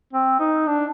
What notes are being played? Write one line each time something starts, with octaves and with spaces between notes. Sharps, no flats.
C4
D#4
D4